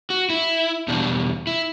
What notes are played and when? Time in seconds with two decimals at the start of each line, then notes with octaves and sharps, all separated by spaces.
0.10 F#4
0.30 E4
0.88 E2 B2 G3 D4
1.47 E4